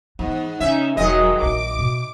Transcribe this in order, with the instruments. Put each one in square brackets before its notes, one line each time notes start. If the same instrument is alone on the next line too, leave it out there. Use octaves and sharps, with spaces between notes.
[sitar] G#2 [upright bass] E3 B3
[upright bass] C#3 [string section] C#4 D#4 [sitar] E5
[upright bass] E1 [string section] D#3 F#3 G#3 [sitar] D#5
[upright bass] A#1 D#4 [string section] D6
[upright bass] B2